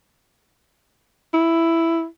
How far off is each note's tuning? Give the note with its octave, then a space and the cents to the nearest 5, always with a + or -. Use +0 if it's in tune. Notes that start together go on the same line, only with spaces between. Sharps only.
E4 +5